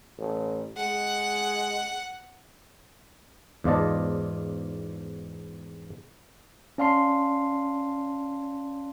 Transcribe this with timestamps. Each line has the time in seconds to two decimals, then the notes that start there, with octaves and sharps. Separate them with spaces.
0.18 A1
0.77 G#3 F#5
3.64 E2 G#2 F4 D5 D#5 A5
6.78 C#4 D5 F5 A5 C6 C7